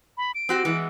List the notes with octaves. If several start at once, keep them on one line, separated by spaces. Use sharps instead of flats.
B5
D7
C4 F#4 G4
E3 G#3 B3